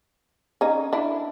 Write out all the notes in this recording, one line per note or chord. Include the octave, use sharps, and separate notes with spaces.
C#4 D#4
D4 E4